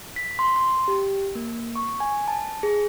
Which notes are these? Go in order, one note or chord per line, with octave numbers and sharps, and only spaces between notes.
B6
C6
C6
G4
A#3
C#6
G#5
A5
G#4